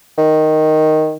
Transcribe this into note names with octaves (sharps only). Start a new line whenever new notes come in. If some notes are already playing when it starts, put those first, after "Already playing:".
D#3